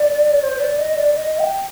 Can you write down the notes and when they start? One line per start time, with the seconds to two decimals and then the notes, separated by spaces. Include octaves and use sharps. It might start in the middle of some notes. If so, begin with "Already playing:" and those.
Already playing: D5
0.42 C5
0.55 C5
0.60 D5
0.78 D#5
0.96 D5
1.14 D#5
1.39 G5